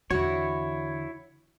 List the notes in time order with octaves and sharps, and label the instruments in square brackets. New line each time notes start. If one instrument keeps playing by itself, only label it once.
[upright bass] E2 D3 [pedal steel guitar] E4 C#5 [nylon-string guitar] F#4